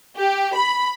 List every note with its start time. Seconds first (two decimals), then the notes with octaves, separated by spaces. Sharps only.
0.18 G4
0.55 B5